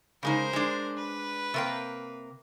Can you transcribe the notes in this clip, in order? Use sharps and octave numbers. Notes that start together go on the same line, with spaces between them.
C#3 G#3 D#4 A#4 C5
G#3 D4
B4
C3 A#3 G5